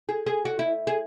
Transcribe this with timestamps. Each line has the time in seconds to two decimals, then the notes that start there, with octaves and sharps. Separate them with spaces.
0.09 G#4
0.27 G#4
0.45 F#4
0.59 E4
0.87 G#4